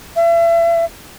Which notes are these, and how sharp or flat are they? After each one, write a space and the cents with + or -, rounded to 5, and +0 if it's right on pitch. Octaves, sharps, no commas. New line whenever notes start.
E5 +35